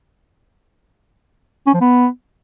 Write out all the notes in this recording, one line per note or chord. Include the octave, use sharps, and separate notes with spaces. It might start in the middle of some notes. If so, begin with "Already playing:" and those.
C#4
F3
B3